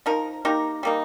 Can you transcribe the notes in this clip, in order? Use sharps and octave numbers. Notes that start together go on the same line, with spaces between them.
F3 D#4 A#4
A#3 D#4 G4 A#4
G3 A#3 D#4